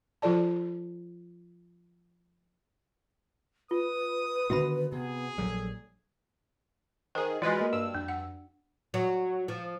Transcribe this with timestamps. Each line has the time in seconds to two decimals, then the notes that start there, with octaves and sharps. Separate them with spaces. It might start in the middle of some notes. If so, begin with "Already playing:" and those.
0.22 F3 F4 A4 D5 A5
3.71 F4 B4 D#6
4.50 D3 D#3 B3 F#4 E5 B5
4.92 C3 B3 G#4
5.38 A#1 F#3 G3 A4
7.15 D#3 G#4 C5
7.42 E3 G#3 F4 F#4 B4 D5
7.57 A#3 D#5 F6
7.73 G2 E6
7.94 F2 D4
8.08 F#5
8.94 F#3
9.48 F3